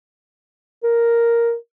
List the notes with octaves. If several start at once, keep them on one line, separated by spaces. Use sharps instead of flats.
A#4